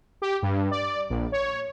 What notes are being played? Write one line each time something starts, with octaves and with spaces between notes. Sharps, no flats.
G4
G2
D5
A#1
C#5